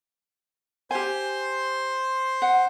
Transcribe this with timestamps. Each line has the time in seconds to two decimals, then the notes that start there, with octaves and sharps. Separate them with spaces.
0.91 G4 C5 G#5 C6
2.42 F#5